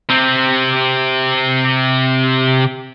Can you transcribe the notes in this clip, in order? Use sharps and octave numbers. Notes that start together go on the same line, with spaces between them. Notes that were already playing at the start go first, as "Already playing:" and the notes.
C3 C4